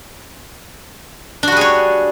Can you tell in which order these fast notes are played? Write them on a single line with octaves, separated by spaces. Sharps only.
D4 F#4 G3 G#4 C#5